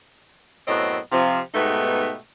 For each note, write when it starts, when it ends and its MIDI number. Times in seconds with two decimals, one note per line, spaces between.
0.68 0.98 42
0.68 0.98 45
0.68 0.98 59
0.68 0.98 60
0.68 0.98 73
0.68 0.98 75
1.12 1.39 48
1.12 1.39 53
1.12 1.39 65
1.54 2.17 44
1.54 2.17 47
1.54 2.17 57
1.54 2.17 59
1.54 2.17 63
1.54 2.17 67